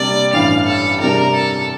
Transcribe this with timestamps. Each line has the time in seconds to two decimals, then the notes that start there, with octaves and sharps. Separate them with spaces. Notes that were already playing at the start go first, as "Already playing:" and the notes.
Already playing: C3 G3 A#3 D4 D5
0.33 A1 G2 E3 F5
0.66 A4
1.00 C3 G3 D4 G4 A#4
1.35 A4